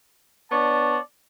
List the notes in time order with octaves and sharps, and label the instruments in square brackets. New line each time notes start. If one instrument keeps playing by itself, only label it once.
[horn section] B3 D4 C#5 D5 A5